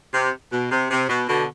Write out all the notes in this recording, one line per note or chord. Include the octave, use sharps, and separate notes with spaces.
C3
B2
C3
C3
B2
B2 D3